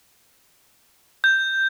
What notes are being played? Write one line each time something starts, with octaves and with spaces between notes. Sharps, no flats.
G6